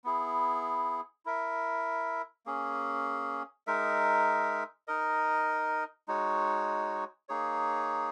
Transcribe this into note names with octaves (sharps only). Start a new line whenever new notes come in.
B3 E4 G#4
E4 A#4 E5
A#3 C#4 G#4
G#3 D#4 A#4 E5
D#4 A#4 D#5
G#3 D#4 F#4 C#5
A#3 D#4 G#4 C#5